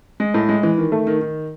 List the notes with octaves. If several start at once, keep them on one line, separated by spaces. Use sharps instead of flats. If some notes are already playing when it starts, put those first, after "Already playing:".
G#3
A2
G#3
E3
D#3
A3
D#3
D#3